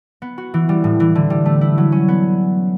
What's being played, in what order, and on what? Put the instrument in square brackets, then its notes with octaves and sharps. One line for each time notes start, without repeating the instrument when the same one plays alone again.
[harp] B3
F#4
E3
G3
A2
E3
D3
G3
A3
E4
F#3
C#4
B3